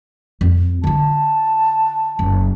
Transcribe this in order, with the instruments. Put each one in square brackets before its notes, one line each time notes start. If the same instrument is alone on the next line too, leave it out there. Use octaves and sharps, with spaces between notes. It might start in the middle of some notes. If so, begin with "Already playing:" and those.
[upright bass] F2
[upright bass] D3 F4 [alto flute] A5
[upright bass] F#1